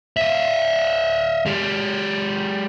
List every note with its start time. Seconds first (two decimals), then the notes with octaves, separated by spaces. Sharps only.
0.17 D#5 E5
1.46 G#3 G4